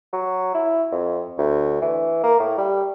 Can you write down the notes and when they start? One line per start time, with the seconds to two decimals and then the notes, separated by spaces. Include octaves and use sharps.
0.13 F#3
0.54 E4
0.92 F2
1.38 D2
1.82 E3
2.23 A#3
2.40 A2
2.58 G3